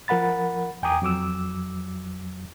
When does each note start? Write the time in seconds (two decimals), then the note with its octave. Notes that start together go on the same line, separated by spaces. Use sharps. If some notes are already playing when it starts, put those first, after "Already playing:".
0.08 F3 A#4 F#5 B5 A6
0.83 E2 G5 G#5 A#5 D6 D#6
1.02 F2 F#3 D6 E6